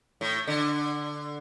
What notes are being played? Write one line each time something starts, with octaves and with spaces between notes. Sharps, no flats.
A2
D3